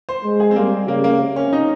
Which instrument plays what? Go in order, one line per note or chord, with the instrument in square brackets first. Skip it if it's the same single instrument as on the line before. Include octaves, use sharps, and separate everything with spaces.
[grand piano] C5
[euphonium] G#3
[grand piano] G#4
C4
[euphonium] G3 [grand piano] A#3
[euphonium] C#3 [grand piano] A#3
[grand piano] A#3
[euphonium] C3
[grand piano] C#4
D#4